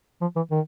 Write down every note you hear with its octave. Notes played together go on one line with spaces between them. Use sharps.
F3
E3
D#3